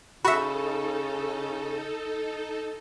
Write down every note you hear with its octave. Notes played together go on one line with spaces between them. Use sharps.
C#3 D#4 F#4 A4 E5 B5